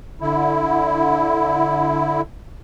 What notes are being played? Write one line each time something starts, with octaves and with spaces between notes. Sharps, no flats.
D3 E4